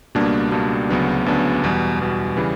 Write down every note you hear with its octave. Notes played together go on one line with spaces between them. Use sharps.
C#2 B2 G3 A#3 D4
C#2 B2 G3 A#3 D4
D2 C#3 F#3 B3 D4
D2 C#3 F#3 B3 D4
E2 B2 G3
E2 B2 G3
C#3 E3 G3